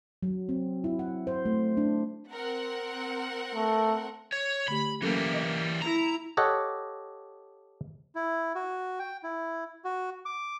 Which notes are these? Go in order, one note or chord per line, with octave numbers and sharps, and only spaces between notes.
F#3
C4
E4
F#5
C5
A3
D4
C4 A#4 F#5
A3
C#5
D3 A3 G4 B5
E3 F#3 G3 A#3 C#4 A4
D#5
E4 A#5 A#6
G4 A4 C#5 D#5 F#5
E4
F#4
G5
E4
F#4
D6